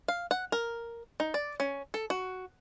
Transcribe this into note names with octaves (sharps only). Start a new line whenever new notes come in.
F5
F#5
A#4
D#4
D5
C#4
A4
F#4